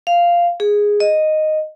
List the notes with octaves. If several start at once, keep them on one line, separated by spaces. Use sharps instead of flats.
F5
G#4
D#5